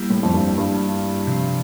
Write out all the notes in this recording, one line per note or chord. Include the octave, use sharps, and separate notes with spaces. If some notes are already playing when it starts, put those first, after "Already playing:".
Already playing: G3 A#3 E4 G4
A2
F2
G2
G2
C3 F3 C4